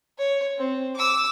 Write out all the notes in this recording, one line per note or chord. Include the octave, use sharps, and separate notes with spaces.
C#5
C4
D6 E6